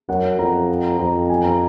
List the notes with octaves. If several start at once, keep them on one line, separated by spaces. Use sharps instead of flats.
F#2 F#5
F2 A#5
F2 A#5
G#5
A#5